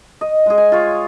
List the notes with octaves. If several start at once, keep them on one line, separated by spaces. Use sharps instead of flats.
D#5
G#3 G#4
G#5
F4 C#5